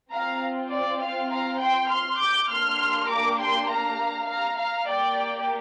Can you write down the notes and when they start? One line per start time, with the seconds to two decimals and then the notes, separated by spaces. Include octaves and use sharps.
0.11 C4 F4 F5 A#5
0.71 D5
1.00 F5
1.31 F5 A#5
1.60 G5 C6
1.90 C6 F6
2.19 D6 G6
2.49 A#3 D4 G4 C6 F6
3.09 A#5 D6
3.39 G5 C6
3.69 F5 A#5
4.28 F5 A#5
4.58 F5 A#5
4.88 A#3 G4 D5 G5